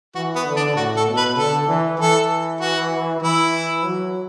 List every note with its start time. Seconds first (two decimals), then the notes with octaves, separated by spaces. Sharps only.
0.15 E3 F#4
0.36 B3
0.46 D3
0.56 D4
0.76 A2 F#4
0.97 A4
1.07 B2
1.17 B4
1.37 D3 A4
1.68 E3
1.99 E3 A4
2.61 F#4
3.21 E3 E4
3.84 F#3